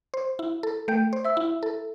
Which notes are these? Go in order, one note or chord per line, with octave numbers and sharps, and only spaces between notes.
C5
E4
A4
A3 G5 G6
C5
E5 E6
E4
A4